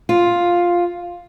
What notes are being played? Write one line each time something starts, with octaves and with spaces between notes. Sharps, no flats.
F4